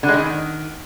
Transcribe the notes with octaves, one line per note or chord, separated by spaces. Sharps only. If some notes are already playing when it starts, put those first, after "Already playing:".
D3
G#3
D#3